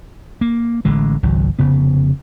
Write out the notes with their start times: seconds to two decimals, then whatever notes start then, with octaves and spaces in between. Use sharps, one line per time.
0.41 A#3
0.85 A1 D3 G#3
1.23 G#1 C#2 F#3
1.59 F1 C#3 B3